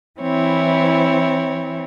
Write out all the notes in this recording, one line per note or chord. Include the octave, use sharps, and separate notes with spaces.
E3 C4 E4 C#5